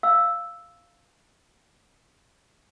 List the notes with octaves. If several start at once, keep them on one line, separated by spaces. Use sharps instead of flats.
F5 E6